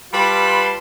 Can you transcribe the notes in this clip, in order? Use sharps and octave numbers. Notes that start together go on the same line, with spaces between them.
G3 F4 B4 A5 C6